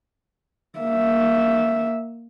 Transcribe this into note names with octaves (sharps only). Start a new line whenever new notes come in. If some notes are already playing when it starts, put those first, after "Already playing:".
A#3 E5